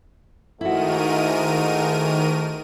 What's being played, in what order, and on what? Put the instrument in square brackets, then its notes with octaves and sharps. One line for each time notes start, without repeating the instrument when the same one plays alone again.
[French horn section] G#2 A3 [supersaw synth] D#3 A#4 D#7 [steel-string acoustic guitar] E4 F#4